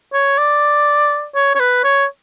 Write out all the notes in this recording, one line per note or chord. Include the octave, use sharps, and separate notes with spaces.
C#5
D5
C#5
C#5
B4
C#5